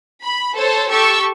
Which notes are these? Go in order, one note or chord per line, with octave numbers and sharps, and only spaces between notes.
B5
A4 C5 C#5
G4 A4 C#6 E6